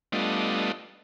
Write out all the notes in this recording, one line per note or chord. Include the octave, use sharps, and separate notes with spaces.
G3 A3 B3 D4 F4 D#5